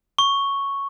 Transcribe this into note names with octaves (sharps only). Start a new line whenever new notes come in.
C#6